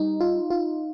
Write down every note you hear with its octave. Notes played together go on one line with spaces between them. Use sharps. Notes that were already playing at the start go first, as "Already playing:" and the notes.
Already playing: G3 D#4
F4
F4